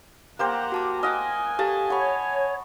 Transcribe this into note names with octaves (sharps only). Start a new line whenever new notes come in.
A#3 G4 C5 F#5 A#5
F#4 A5 D6
D#5 F#5 G#5 D6 F6
G4 A4 F5 A5
C#5 F#5 B5 C#6